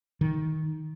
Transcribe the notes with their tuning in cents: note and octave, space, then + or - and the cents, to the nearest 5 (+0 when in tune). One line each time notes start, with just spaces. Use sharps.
D#3 +10